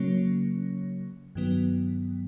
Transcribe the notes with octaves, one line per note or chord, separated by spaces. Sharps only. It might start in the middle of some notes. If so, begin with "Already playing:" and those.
Already playing: C#3 F#3 A#3 C#4
G2 D#3 F#3 B3